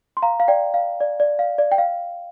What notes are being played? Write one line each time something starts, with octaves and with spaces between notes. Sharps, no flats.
C6
F5 A#5
F5
D5 G5
F5
D5
D5
F5
D5
G5
F5